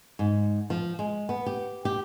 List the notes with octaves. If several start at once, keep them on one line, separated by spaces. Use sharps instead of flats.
G#2
F3
G#3
B3
G4
G4